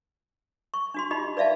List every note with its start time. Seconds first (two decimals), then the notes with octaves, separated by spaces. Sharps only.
0.74 C#6
0.94 D4 F#4 C6
1.11 D#4 F4 G4 D#5 B5
1.37 B4 D5 E5 F5 A5